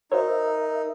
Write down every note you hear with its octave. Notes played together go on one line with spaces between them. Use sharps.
D#4 F#4 A#4 C5 C#5 E5